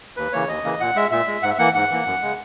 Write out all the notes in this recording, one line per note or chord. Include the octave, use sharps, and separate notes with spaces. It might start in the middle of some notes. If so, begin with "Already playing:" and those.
D#2 B4
C#3 E3 A#3 C#5
D#2 D#5
C#3 E3 A#3
A#2 F#5
G#3 E5
A#2 E5
G#3
G#2 F#5
E5
E3 A#3 F#5
G#2 F#5
E3 A#3
F#2
C#3 G#3